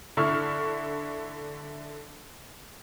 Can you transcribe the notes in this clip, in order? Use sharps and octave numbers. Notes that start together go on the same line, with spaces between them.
D3 E4 C#6 F6